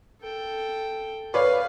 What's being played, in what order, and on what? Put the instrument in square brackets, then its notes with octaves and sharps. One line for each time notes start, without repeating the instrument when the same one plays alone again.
[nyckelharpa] A4 G5
[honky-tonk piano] B4 C#5 D5 [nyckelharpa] F5